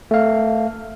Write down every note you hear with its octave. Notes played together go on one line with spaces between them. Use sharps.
A3 F5